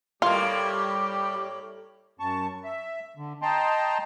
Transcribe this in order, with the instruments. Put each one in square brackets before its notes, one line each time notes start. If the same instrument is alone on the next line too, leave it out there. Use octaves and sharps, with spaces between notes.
[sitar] A2 A#3 [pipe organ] G3 G4 [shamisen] F4
[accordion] F#2 A5 C#6
E5
D3
D#5 G5 A5 A#5 C6